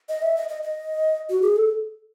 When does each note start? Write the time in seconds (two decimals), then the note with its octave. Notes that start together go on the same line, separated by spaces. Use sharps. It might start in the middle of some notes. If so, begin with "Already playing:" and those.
0.09 D#5
0.22 E5
0.37 D#5
0.49 D#5
0.63 D#5
1.30 F#4
1.42 G#4
1.56 A4